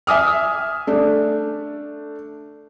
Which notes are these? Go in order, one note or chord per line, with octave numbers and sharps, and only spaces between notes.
E5 G#5 D#6 F6
A3 D4